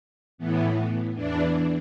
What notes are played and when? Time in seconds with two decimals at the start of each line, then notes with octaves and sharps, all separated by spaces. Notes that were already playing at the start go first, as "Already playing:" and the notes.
0.38 A2 E3 B3
1.15 E2 E3 D4